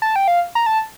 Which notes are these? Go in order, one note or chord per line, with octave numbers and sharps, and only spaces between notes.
A5
G5
F5
A#5
A5